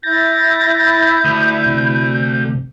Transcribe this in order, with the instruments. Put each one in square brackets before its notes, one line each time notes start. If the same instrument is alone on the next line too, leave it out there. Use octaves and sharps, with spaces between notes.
[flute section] E4 [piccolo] G6 [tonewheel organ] A6 A#6
[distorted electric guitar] D2 [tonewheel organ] D#6
[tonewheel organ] C3